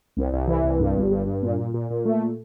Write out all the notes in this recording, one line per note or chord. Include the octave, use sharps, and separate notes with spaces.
C2
C2
E3
C2
G2
G1
G2
G2
A#2
A#2
A#2
A#2
A3